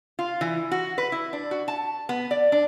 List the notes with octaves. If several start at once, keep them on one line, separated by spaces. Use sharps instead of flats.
F4
E3
F#4
B4
E4
D4
F#4
A5
B3
D5
D4